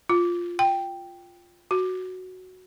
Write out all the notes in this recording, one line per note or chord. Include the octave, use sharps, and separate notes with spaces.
F4
G5
F#4